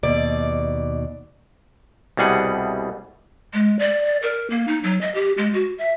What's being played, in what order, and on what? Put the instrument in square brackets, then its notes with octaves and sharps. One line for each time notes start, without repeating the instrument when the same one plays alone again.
[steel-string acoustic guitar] D#2 B2 D5
[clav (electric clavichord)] C2 B2 G3 G#4 F#5
[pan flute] G#3
D5
A#4
A#3
D#4
F#3
D#5
G4
G#3
F#4
E5